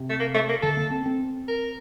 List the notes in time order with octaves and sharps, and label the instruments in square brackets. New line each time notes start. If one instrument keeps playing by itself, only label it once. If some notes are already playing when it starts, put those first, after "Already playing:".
Already playing: [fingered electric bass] C3
[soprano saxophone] A3
A#3
A3
A#3
[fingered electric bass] D3 [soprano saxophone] A4
[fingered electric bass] A#3
C4
C4
[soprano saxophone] A#4